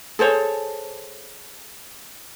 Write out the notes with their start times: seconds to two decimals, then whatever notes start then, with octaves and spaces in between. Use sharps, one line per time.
0.19 G#4 A4 C5 C#5